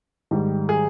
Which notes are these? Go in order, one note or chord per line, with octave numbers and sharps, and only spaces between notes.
G#2 D#3 G3
G#4